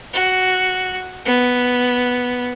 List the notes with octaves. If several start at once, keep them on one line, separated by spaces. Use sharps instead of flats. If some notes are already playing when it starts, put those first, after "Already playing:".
F#4
B3